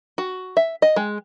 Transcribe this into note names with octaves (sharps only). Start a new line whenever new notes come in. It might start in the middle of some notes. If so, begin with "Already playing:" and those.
F#4
E5
D#5
G#3